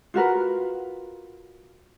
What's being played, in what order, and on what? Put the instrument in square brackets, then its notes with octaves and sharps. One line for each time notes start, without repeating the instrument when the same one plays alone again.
[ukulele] F4 F#4 A#4 B4